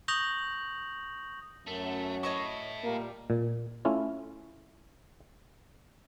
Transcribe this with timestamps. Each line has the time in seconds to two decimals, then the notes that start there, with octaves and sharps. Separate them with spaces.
0.08 C#6 D#6 G6 A#6 F7 F#7
1.67 F#2 A3
2.23 A3 E4 C#5 D#5 C#6
2.83 A#2 G3 A#3 A#4
3.30 A#2
3.85 A3 C#4 E4 F4